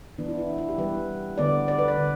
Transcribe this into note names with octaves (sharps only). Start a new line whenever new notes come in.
E3 B3 D4
E4
E4
D4
E4
G4
E3 G3 B3 B4
D3 B3 D5
D5
B4
D5
D3